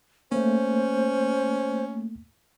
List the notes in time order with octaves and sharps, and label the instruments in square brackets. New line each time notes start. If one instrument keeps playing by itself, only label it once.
[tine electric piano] A3 A#3 [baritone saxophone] C#4 [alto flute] C5